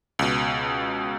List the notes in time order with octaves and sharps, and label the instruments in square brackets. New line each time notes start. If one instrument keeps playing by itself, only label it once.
[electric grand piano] C#2 B2